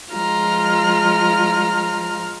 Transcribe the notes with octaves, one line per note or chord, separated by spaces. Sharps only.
F3 G#3 F4 A#5 F6